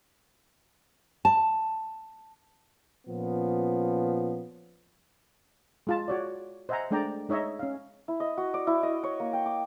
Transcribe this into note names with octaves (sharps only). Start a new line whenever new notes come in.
A5
A#2 F3 B3 C#4
G#3 F4 A5
F#4 C#5 D5
C5 D#5 E5 F#5 G#5 A#5
G#3 A3 D4 D5 G5 A#5
G#3 D#4 C#5 D#5 E5
C#4 F5
E4
D#5
F#4
D5
E4
D#5
C#5
A#3
G5
D6